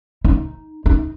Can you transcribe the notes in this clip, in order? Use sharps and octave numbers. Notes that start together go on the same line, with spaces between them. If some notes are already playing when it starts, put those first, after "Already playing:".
D#4
D#4